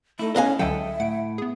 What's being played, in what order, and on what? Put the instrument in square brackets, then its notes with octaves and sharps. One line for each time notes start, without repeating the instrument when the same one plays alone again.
[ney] A3 [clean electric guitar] D#4 E4
[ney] C#4 [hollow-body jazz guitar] D#5 F5 G#5 [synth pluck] F#6
[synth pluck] C#2 D3 F#3 [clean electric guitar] A4 D#5 [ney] E5 [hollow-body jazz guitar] G5
[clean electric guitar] A2 [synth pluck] F#5 D7
[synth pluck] B3 G#4